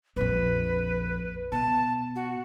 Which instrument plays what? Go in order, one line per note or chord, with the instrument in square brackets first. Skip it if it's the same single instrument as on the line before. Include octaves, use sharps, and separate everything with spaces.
[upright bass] A#1 F2 [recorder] B4
[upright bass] B2 [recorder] A5
[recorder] F#4